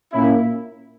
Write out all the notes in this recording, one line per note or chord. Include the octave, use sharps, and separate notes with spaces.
A#2 A#3 C#4 E4